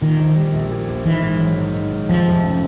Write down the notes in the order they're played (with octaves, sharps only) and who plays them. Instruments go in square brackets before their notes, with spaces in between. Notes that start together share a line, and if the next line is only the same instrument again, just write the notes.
[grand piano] A#2 [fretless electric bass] D#3
[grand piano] A#1
G3
A#1
A#2
A#1
[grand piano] D#3 [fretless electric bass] E3
[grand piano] G#2
F#3
G#2
D#3
G#2
[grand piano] F2 [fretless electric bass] F3
[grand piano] F1
C#3